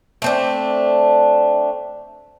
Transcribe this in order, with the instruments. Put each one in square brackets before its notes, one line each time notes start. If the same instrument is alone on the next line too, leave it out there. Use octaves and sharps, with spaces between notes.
[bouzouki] A3 C4 D4